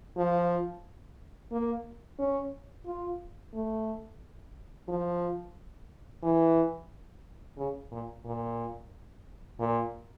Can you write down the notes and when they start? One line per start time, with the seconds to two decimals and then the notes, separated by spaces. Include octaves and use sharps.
0.17 F3
1.52 A#3
2.19 C#4
2.86 F4
3.54 A3
4.88 F3
6.23 E3
7.58 C#3
7.91 A#2
8.25 A#2
9.60 A#2